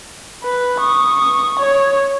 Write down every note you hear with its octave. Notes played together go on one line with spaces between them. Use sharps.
B4
C#6 D#6
C#5